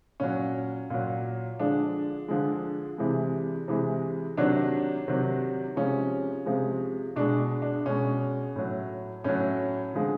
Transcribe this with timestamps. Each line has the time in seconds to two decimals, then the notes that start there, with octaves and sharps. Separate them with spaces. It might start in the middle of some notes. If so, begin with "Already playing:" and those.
0.20 A#2 F#3 C#4
0.90 A#2 F#3
1.60 D3 F3 G#3 D4
2.28 D3 F3 G#3
2.98 C3 E3 G#3
3.68 C3 E3 G#3
4.37 C3 D#3 F#3 D4
5.08 C3 D#3 F#3
5.76 C3 F3 G#3 C#4
6.46 C3 F3 G#3
7.16 B2 G#3 D4
7.62 D4
7.86 B2 G#3 C#4
8.56 A2 F#3
9.24 A2 F#3 C#4
9.94 D3 F3 G#3